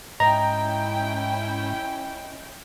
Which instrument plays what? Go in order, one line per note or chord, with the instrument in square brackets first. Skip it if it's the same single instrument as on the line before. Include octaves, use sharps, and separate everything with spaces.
[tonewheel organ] G#2 [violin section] C#4 E4 G5 [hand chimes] D#5 [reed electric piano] A#5